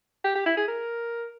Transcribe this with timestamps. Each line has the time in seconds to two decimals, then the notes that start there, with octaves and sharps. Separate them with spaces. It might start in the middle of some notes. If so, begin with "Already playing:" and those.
0.24 G4
0.35 G4
0.46 E4
0.57 G#4
0.68 A#4